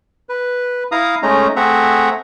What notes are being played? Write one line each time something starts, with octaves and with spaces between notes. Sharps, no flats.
B4
E4 F5 A#5 D#6
G#3 A3 C#4 D#4 A#5
A3 C4 G#4 E5 F#5 A#5